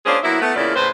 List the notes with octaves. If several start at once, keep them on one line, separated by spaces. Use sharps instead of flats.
A#3 C#4 D4 F4 G#4 C5
F#3 A#3 B3 E4
A3 B3
E2 C#3 A#3 E4 F4 D5
A2 C#3 B4 C5